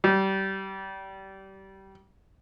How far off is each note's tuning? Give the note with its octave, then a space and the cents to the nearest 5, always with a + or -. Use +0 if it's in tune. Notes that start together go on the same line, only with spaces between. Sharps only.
G3 -25